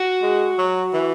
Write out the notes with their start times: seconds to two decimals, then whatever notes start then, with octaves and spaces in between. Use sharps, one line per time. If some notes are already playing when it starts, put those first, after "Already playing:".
Already playing: F#4
0.23 G#3
0.58 F#3
0.93 E3